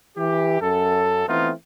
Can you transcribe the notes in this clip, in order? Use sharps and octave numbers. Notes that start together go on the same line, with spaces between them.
E3 G4
F#2 A4
E3 A3 B3 C4 D#4 F4